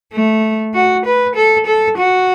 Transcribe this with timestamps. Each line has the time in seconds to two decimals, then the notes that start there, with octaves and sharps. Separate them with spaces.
0.13 A3
0.74 F#4
1.05 B4
1.36 A4
1.67 A4
1.97 F#4